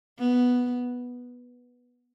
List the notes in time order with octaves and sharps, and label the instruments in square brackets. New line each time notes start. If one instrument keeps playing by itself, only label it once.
[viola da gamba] B3